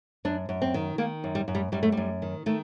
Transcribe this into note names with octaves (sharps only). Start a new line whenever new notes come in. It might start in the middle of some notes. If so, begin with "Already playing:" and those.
F#2 D4
F#2
C4
D#3
D#3 A#3
F#2
G3
F#2
G3
F#2 G3
A3
F#2 G3
D#3
D#3 A3